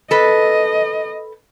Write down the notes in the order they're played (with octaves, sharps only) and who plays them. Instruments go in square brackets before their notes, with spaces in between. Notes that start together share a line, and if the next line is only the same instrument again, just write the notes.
[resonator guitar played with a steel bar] A4 B4 [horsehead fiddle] D#5